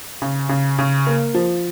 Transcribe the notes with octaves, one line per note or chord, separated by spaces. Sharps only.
C#3
C#3
C#3
A#3
F3